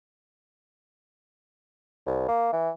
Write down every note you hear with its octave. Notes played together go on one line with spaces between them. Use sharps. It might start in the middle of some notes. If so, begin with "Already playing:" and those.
C2
A#3
E3